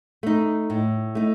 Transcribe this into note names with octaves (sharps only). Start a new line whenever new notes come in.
A3 D#4
A2
A3 D#4